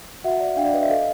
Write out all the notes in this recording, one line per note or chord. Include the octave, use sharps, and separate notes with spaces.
F#4 E5 F#5
D5
D4 F5 G5
D5
B4 D#5
D5 E5
A4 D#5 F5